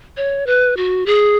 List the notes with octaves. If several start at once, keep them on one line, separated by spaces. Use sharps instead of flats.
C#5
B4
F#4
G#4